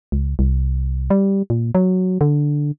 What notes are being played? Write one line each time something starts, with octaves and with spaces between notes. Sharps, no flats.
C#2
C2
G3
A#2
F#3
D3